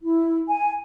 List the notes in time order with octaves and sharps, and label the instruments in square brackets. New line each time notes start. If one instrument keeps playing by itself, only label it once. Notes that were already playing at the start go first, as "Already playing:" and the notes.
[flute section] E4
G#5